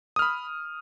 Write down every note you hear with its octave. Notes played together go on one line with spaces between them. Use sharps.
B5 D#6 F6